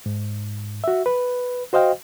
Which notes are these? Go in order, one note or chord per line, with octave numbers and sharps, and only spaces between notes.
G#2
F#4 E5
B4
F#4 C5 D#5 F5 G5